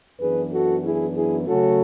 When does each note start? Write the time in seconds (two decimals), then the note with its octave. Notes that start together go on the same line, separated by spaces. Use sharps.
0.20 F#2 E3 B3 D4 G#4 B4
0.53 F#4 A4
0.84 E4 G#4
1.16 E4 G#4
1.47 C#3 F#3 A3 C#4 F#4 A4